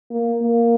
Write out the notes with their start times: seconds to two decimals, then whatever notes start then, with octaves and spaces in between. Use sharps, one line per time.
0.11 A#3
0.42 A#3